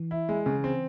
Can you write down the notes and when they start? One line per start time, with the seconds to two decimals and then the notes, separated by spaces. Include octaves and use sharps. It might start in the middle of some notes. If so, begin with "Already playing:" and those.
Already playing: E3
0.11 E4
0.29 G#3
0.46 C#3
0.64 C4